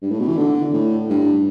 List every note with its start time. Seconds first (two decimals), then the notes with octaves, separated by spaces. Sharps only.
0.02 G2
0.11 A2
0.19 B2
0.28 E3
0.37 D3
0.73 A2
1.09 G2